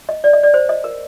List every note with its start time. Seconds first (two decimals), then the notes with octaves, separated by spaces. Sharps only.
0.09 D#5
0.24 D5
0.33 D#5
0.43 D5
0.54 C5
0.69 D#5
0.84 A#4